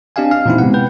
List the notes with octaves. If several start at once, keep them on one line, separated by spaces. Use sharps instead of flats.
C4 D4 G4 D#5 F5 G#5
F5 F6
A#2 E3 C4 D#4 E4
C3 G#3 B3 F#5
B4 G5 G6